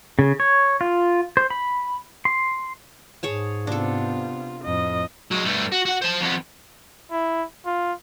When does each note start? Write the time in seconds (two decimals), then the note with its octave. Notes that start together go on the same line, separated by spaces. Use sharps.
0.19 C#3
0.40 C#5
0.81 F4
1.37 C5
1.50 B5
2.25 C6
3.23 G#2 G#4 C#5 A5
3.67 C3 B3 D4 F4 A4
4.64 F2 A2 D#5
5.31 F#3 G#3
5.45 G2 A3
5.72 F#4
5.85 F#4 F#5
6.02 C5 A5
6.21 F2 B3
7.11 E4
7.66 F4